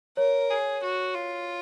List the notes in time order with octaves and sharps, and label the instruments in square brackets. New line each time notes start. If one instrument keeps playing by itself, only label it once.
[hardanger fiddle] A#4 [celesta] C#5
[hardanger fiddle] G#4
F#4
F4